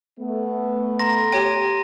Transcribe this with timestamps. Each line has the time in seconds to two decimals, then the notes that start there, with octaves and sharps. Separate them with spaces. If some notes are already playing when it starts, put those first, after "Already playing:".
0.20 A3 B3
0.99 A#5 C6 A#6
1.32 G4 C#5 G5 D#7